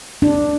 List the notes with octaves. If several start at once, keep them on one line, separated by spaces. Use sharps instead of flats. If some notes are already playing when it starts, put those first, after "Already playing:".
D4